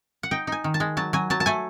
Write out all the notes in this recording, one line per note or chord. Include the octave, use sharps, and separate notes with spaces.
F#5
D#4 G5
D#4 G#5
D#3
A5
G#3
F#3 A5
F#3 G#5
F#3 A5
A5
A3 G#5